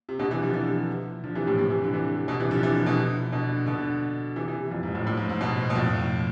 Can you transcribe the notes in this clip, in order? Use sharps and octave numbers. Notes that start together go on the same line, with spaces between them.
C3
B2 D3
C3 E3
D3 F3
C3 E3
D3 F3
C3 E3
A2 C3
A2 C3
C3 E3
D3
C3 E3
B2 D3
C3 E3
D3 F3
C3 E3
B2 D3
B2 D3
B2 D3
C3 E3
C3 E3
F2
G#2
F2 A2
F2 A2
G#2
G#2
G#2 B2
B2
F2 A2